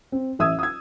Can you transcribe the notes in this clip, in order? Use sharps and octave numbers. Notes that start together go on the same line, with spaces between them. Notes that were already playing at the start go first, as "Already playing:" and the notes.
C4
A1 E5 D#6 E6 G#6
D#6 E6 G#6